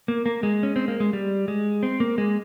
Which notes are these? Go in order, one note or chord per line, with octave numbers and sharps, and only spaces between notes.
A#3
A#3
G#3
C#4
C4
A#3
G#3
G3
G#3
C4
A#3
G#3